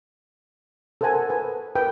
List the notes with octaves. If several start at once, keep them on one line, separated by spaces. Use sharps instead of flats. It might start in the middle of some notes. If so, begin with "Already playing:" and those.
A4 A#4 C5 F#5 G#5 A5
B4 G#5
A#4 B4 G5